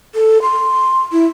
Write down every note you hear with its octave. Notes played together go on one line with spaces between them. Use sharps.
A4
C6
E4